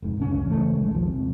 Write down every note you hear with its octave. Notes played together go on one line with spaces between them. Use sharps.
F1 G#2
G1 C#2 F#2 C#4
C#3 E3 A3
A#1 G#3
D#2 F3
C3